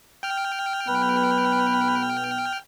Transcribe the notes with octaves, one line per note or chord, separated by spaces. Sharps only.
G5 F6
B1 B3 B4